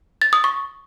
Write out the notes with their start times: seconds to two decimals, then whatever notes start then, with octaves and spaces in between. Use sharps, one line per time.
0.22 A6
0.33 D#6
0.44 C#6